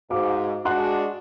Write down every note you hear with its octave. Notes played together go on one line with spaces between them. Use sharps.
G#2 F#4 F5 D6
G#3 D4 F#4 F#5 C6 F#6